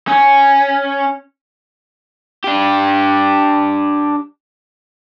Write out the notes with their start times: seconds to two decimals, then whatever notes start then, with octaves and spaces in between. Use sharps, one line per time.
0.08 C#4
2.44 D4 G4